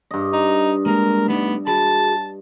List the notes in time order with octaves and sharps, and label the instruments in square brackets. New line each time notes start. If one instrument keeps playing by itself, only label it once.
[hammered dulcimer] G2 D#5
[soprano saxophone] D#4
[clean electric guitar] G#3 A#3 [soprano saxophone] A#4
[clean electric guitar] A3 D#4 D5 [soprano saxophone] B3
[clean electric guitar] F#4 G#4 B5 [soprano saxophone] A5